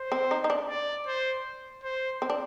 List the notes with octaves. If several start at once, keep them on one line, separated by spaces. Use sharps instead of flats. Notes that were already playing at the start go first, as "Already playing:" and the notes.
Already playing: C5
C4
D#4
D#4
D4
D5
C5
C5
C4
D4